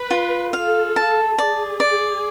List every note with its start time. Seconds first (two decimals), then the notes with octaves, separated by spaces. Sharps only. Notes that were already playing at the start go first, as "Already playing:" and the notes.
Already playing: B4
0.11 F4
0.53 A4 F5
0.96 A5
1.38 G#4 D5
1.80 D5